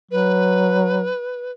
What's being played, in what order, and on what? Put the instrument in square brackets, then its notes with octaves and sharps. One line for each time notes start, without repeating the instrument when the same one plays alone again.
[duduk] F#3 [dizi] B4